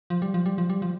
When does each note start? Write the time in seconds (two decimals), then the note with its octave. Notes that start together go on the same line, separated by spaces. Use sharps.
0.10 F3
0.22 G3
0.34 F3
0.46 G3
0.58 F3
0.70 G3
0.82 F3